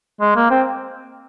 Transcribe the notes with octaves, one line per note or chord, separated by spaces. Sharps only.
G#3
A#3
C4